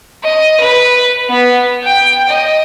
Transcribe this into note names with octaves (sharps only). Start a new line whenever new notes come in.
D#5
B4
B3
G5
D#5